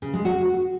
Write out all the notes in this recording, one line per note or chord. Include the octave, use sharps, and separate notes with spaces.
C#3
G#3
F#4